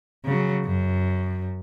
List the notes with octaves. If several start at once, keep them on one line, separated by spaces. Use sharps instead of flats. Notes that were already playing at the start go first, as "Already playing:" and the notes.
C#3 F#3
F#2